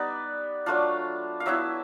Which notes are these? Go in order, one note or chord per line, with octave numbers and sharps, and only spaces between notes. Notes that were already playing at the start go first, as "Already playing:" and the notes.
Already playing: G3 B3 D#4 D5
F#3 A3 D4 F4
F5
F#3 B3 E4 E5